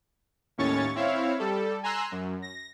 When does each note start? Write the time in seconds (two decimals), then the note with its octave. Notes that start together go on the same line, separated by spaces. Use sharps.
0.58 D#2 A2 C#4 C#5 C#6 A6
0.95 C4 E4 C#5 E5 F5
1.39 G3 A4
1.83 G#5 A#5 C6 E6 F#6
2.12 F#2
2.42 A#6